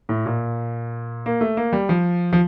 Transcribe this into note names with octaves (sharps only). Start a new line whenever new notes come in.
A2
A#2
A#3
A3
A#3
G3
F3
F3